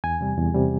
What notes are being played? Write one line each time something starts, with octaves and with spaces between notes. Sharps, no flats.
E2 G#5
C3 G3
E2
C3 G3